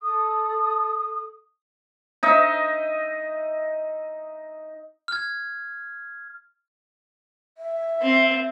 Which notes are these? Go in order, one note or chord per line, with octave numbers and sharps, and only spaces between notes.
A4 D#6
D#4 D#5 E5
F6 G#6
E5
C4